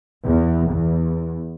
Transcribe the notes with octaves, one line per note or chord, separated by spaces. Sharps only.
E2
E2